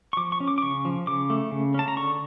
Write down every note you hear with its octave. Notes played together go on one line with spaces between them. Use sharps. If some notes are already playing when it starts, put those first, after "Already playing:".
C#6
F3 D6
C#6
C#4
D6
D6
C#3 C#6
F3
C#3 D6
A3
C#3
C#4 A5
A#5
D3 C#6